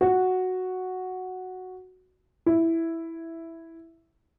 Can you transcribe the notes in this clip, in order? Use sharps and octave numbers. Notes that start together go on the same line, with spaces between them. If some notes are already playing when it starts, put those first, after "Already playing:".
F#4
E4